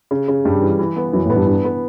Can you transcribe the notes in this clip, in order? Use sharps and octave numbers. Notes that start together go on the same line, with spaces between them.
C#3
C#3
G2 G3
E3
E3
B3
F#2 E3
A2
B3
G2
G2 D4
B3